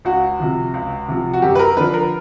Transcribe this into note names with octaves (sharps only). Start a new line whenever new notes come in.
C#2 F#4
C3 F3
C#2
C3 F3
F#4
F#2 G4
B4
A#4
D3 F3 B4
A#4